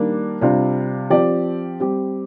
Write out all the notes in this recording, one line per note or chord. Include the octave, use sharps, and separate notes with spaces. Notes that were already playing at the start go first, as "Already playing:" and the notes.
Already playing: D#3 G3 A#3 D4
C3 G3 D4 F4
F3 C4 G4 D5
G3 C4 G4